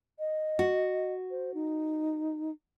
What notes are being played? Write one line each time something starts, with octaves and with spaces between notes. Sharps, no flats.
D#5
F#4
C5
D#4